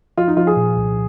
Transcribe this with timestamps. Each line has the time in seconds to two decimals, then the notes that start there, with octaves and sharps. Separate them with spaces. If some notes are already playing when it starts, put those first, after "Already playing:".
0.18 F3 F4
0.28 D#4
0.37 F3 F4
0.47 G#4
0.56 A#2
0.77 C2